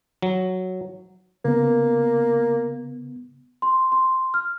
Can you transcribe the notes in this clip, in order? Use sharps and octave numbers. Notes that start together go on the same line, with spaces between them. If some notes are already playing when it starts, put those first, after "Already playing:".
F#3
C#3 A#3 B3
C6
C6
F6